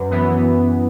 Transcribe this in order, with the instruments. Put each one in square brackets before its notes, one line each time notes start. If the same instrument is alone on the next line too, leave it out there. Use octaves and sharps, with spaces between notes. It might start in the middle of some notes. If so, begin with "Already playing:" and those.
Already playing: [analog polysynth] F#2 [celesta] B4
[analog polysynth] E3 B3